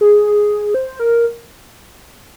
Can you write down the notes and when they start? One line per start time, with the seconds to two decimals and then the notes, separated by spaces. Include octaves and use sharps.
0.01 G#4
0.74 C5
1.00 A#4